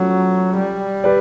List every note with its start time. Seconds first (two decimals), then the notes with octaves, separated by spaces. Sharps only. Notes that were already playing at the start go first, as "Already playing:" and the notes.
Already playing: F3 F#3 A3 C#4
0.57 G3
1.04 G4 B4 D5